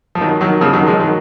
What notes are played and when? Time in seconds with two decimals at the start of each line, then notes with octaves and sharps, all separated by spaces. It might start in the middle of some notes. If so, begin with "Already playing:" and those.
0.15 F3
0.21 D#3 F#3
0.41 D#3 F#3
0.61 C#3 F3
0.73 D#3 F#3
0.87 F3 G#3
1.00 D#3 F#3